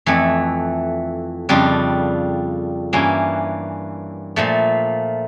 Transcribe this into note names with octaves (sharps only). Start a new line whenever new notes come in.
F2 E3 A3
F2 C#3 G3 D4 F4
G2 E3 A#3 C#4
A#2 F3 A3